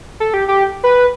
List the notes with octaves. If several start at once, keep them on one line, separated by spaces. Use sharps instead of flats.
A4
G4
G4
B4